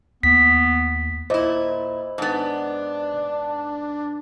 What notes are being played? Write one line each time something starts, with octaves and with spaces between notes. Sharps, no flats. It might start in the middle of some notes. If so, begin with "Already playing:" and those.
D#2 B3 B6
A#2 E4 C5 D#5
G#2 B3 D4